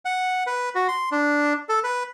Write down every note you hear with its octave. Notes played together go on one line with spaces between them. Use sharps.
F#5
B4
F#4
C6
D4
A4
B4